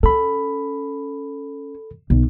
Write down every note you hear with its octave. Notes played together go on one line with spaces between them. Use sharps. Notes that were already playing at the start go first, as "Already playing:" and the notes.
C#4 A4 B5
B1